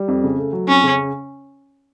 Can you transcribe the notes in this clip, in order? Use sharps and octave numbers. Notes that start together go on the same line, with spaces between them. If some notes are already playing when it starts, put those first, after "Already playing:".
Already playing: G3
F2
C#3
A3
F#3
F2 C#4
C#3